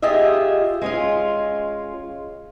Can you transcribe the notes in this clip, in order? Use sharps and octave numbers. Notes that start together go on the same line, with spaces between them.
F4 G4 G#4 D#5 E5
G#3 C#4 F4